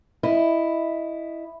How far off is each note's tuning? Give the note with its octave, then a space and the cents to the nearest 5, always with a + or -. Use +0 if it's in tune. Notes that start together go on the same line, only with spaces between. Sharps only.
E4 +0 D#5 -10